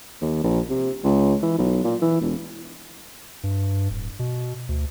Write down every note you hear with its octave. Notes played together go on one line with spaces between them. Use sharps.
D#2
A#1
C3
C#2
E3
B1
A#2
E3
E1
G2
D1
B2
D2